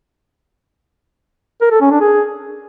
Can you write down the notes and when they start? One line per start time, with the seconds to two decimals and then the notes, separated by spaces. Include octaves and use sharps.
1.61 A#4
1.71 A4
1.81 C#4
1.91 D4
2.00 G#4